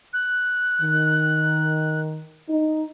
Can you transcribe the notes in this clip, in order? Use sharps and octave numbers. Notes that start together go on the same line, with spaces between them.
F#6
D#3
D#4